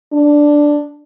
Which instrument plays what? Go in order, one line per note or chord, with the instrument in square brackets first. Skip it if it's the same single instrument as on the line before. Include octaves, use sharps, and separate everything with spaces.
[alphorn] D4